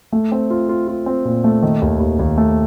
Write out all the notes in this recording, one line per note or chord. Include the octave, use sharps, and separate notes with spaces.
A3
C4
F4
F4
F4
C4
A#2
A3
D#3
D#2
D#2
D#2
A3